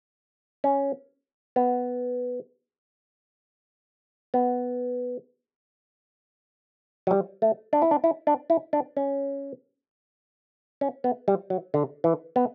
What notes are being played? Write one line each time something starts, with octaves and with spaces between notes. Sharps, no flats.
C#4
B3
B3
F#3
G3
A3
D4
E4
D4
E4
D4
E4
D4
C#4
C#4
B3
G3
F#3
D3
E3
B3